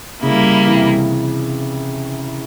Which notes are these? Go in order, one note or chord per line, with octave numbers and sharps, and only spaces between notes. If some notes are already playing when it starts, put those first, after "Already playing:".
C#3 G3 A#3 E4
C3 E3